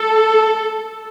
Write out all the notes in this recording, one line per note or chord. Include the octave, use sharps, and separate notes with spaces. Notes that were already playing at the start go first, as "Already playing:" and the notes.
Already playing: A4